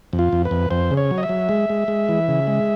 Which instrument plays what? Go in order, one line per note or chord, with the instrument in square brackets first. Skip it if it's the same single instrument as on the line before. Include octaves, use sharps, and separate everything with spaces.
[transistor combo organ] F2
F4
F2
B4
F2
F2 C5
C#3
C#5
F#3
D#5
E5
F#3
G#3
G#3
G#3
E3
C#3
G#3